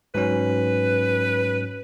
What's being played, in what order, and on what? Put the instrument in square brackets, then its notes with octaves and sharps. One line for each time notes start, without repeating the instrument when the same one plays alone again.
[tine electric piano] G#2 F#3 C#4 [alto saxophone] B4